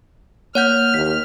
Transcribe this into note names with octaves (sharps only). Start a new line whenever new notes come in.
A#3 C#5 F#5 F6 G6
D#2 B6